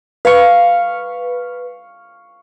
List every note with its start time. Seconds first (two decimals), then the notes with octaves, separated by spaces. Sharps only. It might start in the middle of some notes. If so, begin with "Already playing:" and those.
0.25 B4 F5 C#6